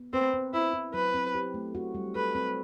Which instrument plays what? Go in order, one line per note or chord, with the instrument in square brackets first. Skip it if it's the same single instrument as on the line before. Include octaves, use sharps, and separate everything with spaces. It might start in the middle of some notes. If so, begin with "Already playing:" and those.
Already playing: [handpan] B3
[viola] C4 [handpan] B4
[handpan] C4
[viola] E4 [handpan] C5
[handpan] E4
[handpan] F#3 [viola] B4
[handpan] C4
G4
A3
F#4
G3
[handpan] A4 [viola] B4
[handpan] C4